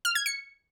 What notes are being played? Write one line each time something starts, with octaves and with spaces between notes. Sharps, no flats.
F6
G#6
C#7